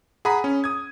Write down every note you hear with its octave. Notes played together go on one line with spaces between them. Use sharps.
G#4 F#5 A#5 B5 D#6
C#4
D#6 G#6